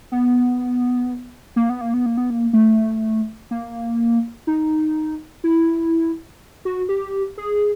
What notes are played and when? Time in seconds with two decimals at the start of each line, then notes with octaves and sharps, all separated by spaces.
0.12 B3
1.56 A#3
1.70 B3
1.81 A#3
1.94 B3
2.06 A#3
2.17 B3
2.30 A#3
2.53 A3
3.51 A#3
4.47 D#4
5.44 E4
6.65 F#4
6.89 G4
7.38 G#4